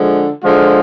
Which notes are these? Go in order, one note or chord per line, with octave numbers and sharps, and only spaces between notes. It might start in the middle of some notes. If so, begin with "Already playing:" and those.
Already playing: D3 F3 G#3
D3 F3 G#3 F4